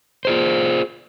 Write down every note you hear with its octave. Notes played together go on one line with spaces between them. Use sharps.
F4 G#4 C5